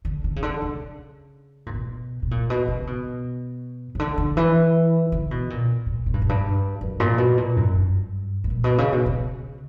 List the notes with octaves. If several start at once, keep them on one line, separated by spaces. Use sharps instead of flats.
D3
D3
C#3
D3
C#3
A#2
B2
B2
A#2
B2
C#3
B2
C#3
D3
D3
E3
D3
B2
A#2
A#2
A#2
G2
F#2
G2
F#2
A#2
B2
A#2
F#2
G2
G2
A#2
B2
C#3
B2
C#3